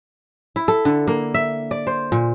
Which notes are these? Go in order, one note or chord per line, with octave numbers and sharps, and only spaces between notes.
E4
A4
D3
A#3
E5
D5
C5
A#2